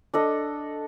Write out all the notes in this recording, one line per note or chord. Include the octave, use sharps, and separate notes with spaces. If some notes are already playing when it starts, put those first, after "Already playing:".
D4 A4 D#5